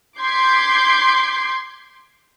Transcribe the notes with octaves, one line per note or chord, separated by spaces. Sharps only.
C6 D6 G6 G#6 B6 C7